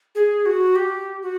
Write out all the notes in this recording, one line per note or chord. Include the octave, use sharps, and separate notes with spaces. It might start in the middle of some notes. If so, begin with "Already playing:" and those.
G#4
F#4
G4
F#4